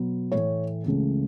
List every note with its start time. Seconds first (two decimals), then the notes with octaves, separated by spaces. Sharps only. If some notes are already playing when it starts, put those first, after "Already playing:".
Already playing: B2 F#3 B3
0.32 A2 E3 A3 C#5
0.84 C#2 C#3 E3 A3